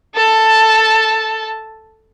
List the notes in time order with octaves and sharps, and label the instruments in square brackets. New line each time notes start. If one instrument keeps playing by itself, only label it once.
[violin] A4 A5